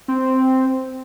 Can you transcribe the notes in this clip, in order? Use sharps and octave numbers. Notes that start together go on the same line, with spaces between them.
C4